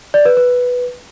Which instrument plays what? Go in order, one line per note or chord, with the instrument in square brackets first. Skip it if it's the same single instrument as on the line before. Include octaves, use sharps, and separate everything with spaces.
[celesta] D5
B4
B4